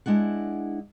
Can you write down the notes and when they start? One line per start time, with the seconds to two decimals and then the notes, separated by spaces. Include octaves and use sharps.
0.06 G#3 D4 E4 F#5